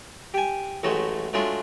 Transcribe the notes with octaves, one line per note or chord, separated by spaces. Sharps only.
G4 G#5
A1 A2 F#3 G#3 A3
F#3 G#3 A3 D4 F4